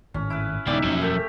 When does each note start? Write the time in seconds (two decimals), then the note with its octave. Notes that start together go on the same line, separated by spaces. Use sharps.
0.14 G#1 A2 C#4
0.30 E4 B4
0.67 D#1 C#2 B3 D#4 E4 G4 D5 E5
0.84 E1 F3 F#3 A#3 C#4
1.02 A3 G4 A#4